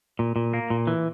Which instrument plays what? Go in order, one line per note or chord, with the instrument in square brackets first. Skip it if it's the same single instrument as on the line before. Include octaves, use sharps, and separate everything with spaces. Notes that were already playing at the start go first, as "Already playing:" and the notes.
[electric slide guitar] A#2
A#2
A#3
A#2
E3